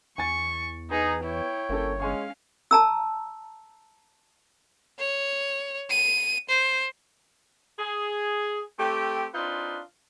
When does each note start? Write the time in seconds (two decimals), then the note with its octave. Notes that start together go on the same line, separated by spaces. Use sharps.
0.18 E2 G#5 C#6 A6
0.91 B3 D#4 G#4
1.24 E4 C#5 G5
1.69 G1 A#3 C#4 A4
2.00 G#3 C#4 F5 G#5 C#6
2.71 A5 A#5 E6
4.99 C#5
5.90 D#7
6.49 C5
7.78 G#4
8.79 A3 C4 G4
9.34 C4 D4 D#4 F4 B4